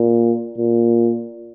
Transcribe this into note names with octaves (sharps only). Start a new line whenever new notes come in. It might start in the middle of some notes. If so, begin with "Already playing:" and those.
Already playing: A#2
A#2